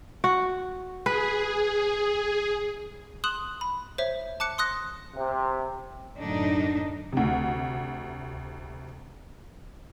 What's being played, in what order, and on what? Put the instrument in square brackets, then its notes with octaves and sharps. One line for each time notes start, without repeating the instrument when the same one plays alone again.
[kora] F#4
[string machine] G#4 [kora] B4
[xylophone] C6 D#6 F#6 E7 F#7
B5
C5 C#5 E5
A5 D6 F#6 C#7
C6 D#6 F#6 A#6
[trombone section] C3
[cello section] F#2 A2 D3 D4 D#4
[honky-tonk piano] D2 C3